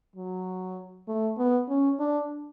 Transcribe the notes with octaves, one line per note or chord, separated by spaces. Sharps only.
F#3
A3
B3
C#4
D4